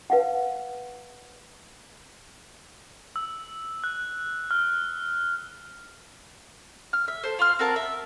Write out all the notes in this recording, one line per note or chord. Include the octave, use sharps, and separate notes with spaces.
B4 F5 F#5
E6
F#6
F6
F6
E5
A4 C5
F4 C6 F6
C4 F#4 A#4 A5
E5